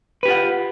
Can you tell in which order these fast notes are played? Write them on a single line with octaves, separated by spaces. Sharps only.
B4 G4 F4 F#5